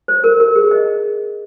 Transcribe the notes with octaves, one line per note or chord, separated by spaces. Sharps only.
C5
A#4
A#4
G#4
D#5